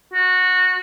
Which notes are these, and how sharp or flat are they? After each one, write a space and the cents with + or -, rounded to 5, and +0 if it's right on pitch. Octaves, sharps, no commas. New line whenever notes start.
F#4 -15